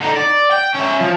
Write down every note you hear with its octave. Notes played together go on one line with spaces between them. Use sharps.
D3 D#4
D5
G5
C#4 E5
F3